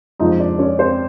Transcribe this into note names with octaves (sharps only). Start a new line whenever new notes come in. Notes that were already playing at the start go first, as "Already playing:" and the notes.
F2 C#3 F3 G#3 D#4 D#5
D4 D5
C#4 C#5
C4 C5